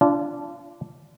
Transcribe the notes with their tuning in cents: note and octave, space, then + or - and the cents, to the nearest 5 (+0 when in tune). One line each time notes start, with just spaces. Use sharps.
D4 -10 F4 -30